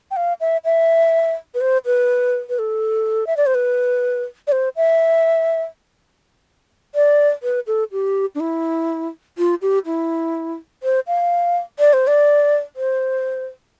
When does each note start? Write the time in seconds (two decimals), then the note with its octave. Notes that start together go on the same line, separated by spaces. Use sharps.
0.11 G5
0.16 F5
0.41 E5
0.65 E5
1.54 B4
1.61 C5
1.86 B4
2.49 B4
2.59 A4
3.27 E5
3.37 D5
3.46 C5
3.55 B4
4.47 D5
4.52 C5
4.76 E5
6.95 D5
7.43 B4
7.67 A4
7.92 G4
8.35 D4
8.40 E4
9.38 F4
9.62 G4
9.86 E4
10.83 C5
11.07 F5
11.79 D5
11.93 C5
12.07 D5
12.76 C5